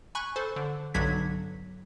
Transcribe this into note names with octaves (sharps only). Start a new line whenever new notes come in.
G#5 B5 C#6 F#6
A4 C5
D3
B1 G2 D3 F#3 G#6 B6